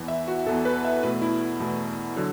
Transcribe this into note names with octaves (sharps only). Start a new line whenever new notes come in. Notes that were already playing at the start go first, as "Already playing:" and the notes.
Already playing: E2 E3 B3
E5
F#4
E2 E3 B3 A4
B4
E5
E2 B2 A3 B4
E4
E2 B2 A3
D3 F#3